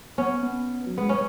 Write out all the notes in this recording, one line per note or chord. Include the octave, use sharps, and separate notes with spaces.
B3 C#4
B3
F#3
G#3 B3
C#4